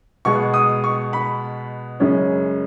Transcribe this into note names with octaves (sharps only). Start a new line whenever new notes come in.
B2 G#3 B3 C#6
D#6
C#6
B5
F#2 C#3 G#3 C#4